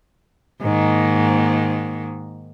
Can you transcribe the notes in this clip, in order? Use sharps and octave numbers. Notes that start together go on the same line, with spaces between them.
G#2 D#3 A#3